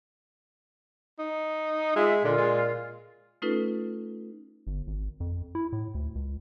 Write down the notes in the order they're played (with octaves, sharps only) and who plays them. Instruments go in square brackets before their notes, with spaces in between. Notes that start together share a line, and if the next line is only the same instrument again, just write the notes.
[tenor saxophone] D#4
[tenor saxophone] G#3 [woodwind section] F4 E5
[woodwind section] A#2 F4 [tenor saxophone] D3
[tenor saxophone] G#3
[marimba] A3 C#4 D#4 F4 A4 B4
[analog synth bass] G1
G#1
F2
E4
A2
D2
C#2